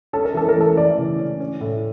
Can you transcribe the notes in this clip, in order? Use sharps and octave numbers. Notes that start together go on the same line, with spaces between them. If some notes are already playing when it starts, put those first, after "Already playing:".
C#4 A4
A#4
E3 A4
A#4
A3 A4
E3 D5
C#3
C#4
C#4
A2